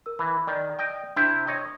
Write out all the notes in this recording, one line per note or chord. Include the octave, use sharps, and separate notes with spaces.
A#4 E6
E3 B5
D#3 D5
D#5 G5
C3 D4 E4 G6
C#5 D#5